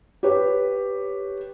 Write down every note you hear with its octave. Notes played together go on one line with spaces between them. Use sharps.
G4 B4 C#5